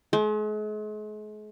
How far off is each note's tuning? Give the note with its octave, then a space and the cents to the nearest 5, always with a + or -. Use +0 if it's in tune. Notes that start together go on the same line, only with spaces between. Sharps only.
G#3 +40